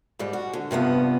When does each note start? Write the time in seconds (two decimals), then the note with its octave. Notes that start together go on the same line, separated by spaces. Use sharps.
0.19 G#2 G3
0.33 F#4
0.53 D3
0.71 G2 C3 F3 B3